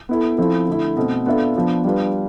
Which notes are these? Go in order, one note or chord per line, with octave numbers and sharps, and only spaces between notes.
B3 E4 A4
F3 C4 E4 A4
D3 A3 E4
B2 A3 C4
B3 D4 F4 A4 E5
F3 B3 D4
G3 D4 F4 B4